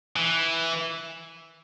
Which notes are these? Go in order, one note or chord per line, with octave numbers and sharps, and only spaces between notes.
E3